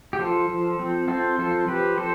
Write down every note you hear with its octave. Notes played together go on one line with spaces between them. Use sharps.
G4
F3 F4 A4
F3
C4
C4 F4 A4
F3 F4 A4
F3 G4 B4
C4 A4 C5